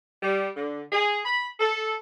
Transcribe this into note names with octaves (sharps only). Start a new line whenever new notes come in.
G3
D3
G#4
B5
A4